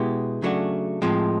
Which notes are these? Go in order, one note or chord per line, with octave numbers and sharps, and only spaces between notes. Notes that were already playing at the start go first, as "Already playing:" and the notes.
Already playing: B2 G#3 B3 E4 G4
C#3 F#3 A3 D4 F#4
A2 F3 G#3 C4